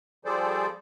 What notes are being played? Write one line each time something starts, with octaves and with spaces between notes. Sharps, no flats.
F3 G3 G#4 A4 C5 D5